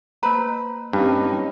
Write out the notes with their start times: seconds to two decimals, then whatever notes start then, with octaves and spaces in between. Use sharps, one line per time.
0.23 A#3 B4 C5 A#5 B5
0.93 G2 C4 C#4 D#4